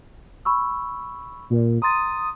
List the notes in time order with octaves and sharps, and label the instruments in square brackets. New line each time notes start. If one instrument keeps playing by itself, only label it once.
[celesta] B5 C#6 E6
[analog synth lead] A#2
[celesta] A#5 C6 A6 [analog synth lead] D#6